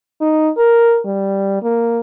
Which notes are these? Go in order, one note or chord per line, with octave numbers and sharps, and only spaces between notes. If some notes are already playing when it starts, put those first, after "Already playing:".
D#4
A#4
G3
A#3